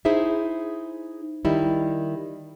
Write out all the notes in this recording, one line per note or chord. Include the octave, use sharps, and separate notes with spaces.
D#4 E4 G#4 C5 E5
D#3 G3 D#4 E4